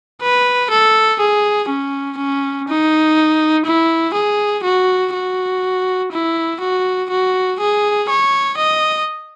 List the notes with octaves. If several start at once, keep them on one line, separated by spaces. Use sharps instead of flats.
B4
A4
G#4
C#4
C#4
D#4
E4
G#4
F#4
F#4
E4
F#4
F#4
G#4
C#5
D#5